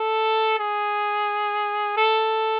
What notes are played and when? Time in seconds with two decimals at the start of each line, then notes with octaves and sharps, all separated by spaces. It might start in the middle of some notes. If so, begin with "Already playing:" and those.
Already playing: A4
0.59 G#4
1.97 A4